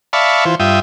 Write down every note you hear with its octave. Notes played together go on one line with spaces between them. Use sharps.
D5 E5 F5 A5 B5 C#6
E3 F4 C5
G2 F4 E5 G5 D#6